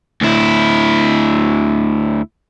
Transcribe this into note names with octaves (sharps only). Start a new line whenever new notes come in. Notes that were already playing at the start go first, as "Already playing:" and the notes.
D2 E4